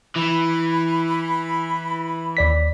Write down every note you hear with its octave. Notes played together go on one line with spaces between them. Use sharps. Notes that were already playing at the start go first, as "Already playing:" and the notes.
E3 B5
D#2 D5 B6